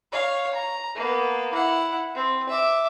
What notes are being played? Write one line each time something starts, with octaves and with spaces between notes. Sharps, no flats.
C#5 F5
A#5
A#3 B3
E4 F#5
C4
E5 D6